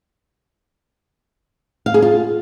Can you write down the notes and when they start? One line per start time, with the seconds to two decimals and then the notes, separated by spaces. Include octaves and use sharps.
1.86 F5
1.94 G#4
2.02 F4